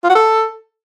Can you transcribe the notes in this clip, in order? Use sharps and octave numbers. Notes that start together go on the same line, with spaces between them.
F4
F#4
A4